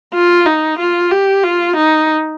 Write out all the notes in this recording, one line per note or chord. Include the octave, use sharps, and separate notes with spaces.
F4
D#4
F4
G4
F4
D#4